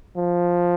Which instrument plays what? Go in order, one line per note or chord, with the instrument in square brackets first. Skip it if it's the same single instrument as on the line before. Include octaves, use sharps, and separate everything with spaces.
[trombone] F3